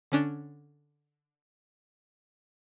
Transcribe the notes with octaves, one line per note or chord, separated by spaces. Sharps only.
D3 C#4 D4